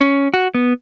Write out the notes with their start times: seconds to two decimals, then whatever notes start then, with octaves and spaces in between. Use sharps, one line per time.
0.01 C#4
0.34 F#4
0.55 B3